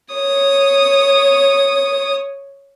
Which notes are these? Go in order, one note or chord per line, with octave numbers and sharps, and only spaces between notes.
C#5 D#6